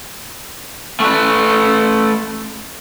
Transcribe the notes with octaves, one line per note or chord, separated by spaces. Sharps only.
A3 B4